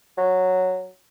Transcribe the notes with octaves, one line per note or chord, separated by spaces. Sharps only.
F#3